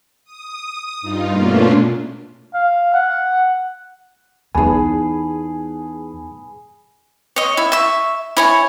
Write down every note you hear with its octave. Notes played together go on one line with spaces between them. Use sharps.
D#6
G2 D#4 F4
B2 A3 A#3 C#4 D4 F4
F5
F#5
E2 B3 D#4 G#4 B4 G#5 A5
C#5 D#5
E4
E5 C#6
E4 C#5 G#5